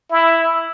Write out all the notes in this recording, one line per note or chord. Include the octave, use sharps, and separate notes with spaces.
E4